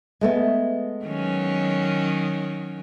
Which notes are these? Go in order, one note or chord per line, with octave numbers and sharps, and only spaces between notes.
G#3 A3 B3
D#3 F#3 C#4